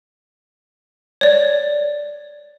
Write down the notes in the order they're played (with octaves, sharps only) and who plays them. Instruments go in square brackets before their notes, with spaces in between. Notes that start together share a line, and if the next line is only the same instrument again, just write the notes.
[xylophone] C#5 D5